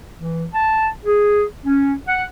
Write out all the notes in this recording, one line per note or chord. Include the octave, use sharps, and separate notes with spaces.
E3
A5
G#4
C#4
F#5